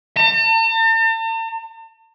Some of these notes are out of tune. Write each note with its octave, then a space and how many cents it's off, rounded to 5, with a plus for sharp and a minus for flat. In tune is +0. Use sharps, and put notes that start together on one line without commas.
A5 +45